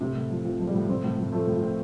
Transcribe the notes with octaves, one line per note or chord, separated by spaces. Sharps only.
A2 C3
A2
F3
F3 C4
F3
G3
A2
A2 C4
A2
A2
F3 A3
A2
F3
C4